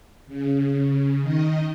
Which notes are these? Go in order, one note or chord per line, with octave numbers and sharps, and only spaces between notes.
C#3
D#3 D#5